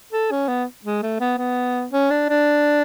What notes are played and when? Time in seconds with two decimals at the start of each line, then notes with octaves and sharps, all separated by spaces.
0.12 A4
0.31 C#4
0.48 B3
0.84 G#3
1.03 A3
1.20 B3
1.38 B3
1.93 C#4
2.10 D4
2.29 D4